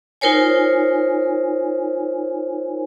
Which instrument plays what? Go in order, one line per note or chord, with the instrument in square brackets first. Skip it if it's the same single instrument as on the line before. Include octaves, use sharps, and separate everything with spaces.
[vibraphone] D#4 F4 A#4 C5 C#5 G#5